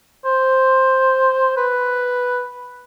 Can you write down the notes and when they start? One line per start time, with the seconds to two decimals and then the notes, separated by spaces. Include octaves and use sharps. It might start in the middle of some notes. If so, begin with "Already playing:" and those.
0.25 C5
1.57 B4